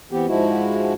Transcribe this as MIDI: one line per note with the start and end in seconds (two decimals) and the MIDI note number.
0.12 0.26 52
0.12 0.26 59
0.12 0.26 60
0.12 0.26 67
0.28 0.93 44
0.28 0.93 53
0.28 0.93 56
0.28 0.93 64
0.28 0.93 66